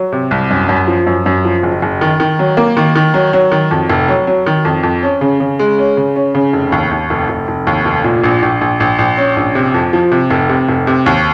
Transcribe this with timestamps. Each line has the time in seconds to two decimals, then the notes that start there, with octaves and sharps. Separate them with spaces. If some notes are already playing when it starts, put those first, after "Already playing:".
Already playing: F#3
0.12 C3
0.31 C2
0.51 F#2
0.69 F#2
0.87 F3
1.07 F#2
1.26 F#2
1.45 F3
1.63 F#1
1.82 F#1
2.01 D#3
2.20 D#3
2.39 F#3
2.57 A#3
2.77 D#3
2.95 D#3
3.14 F#3
3.33 F#3
3.52 D#3
3.71 F2
3.90 F1
4.08 F#3
4.27 F#3
4.46 D#3
4.65 F2
4.83 F2
5.03 C#4
5.21 C#3
5.40 C#3
5.59 G#3
5.79 C#4
5.97 C#3
6.16 C#4
6.35 C#3
6.53 F1
6.72 D#2
6.91 D#2
7.10 F1
7.29 F1
7.48 F1
7.67 D#2
7.85 F1
8.04 A#2
8.24 A#1
8.42 A#1
8.61 A#1
8.80 A#1
8.98 A#1
9.17 C#4
9.37 A#1
9.55 C3
9.74 F2
9.93 F3
10.12 C3
10.30 F1
10.49 C3
10.69 F1
10.87 C3
11.06 D#2